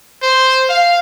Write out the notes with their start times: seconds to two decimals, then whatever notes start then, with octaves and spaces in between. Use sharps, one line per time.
0.22 C5
0.69 F5